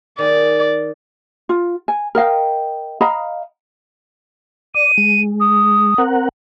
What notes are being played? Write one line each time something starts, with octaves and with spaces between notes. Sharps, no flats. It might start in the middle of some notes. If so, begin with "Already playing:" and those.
D#3 G#4 D5
F4
G#5
A#4 D#5 F5 G5
D#5 F5 A#5 B5
D5 D#7
G#3
D#6
C4 A#4 F#5